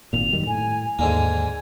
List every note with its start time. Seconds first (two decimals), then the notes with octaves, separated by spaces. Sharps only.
0.13 G#1 A#2 F7
0.33 F#2 D#3 G3
0.47 A2 G#5
0.99 D#2 G#2 D3 A#3 G#5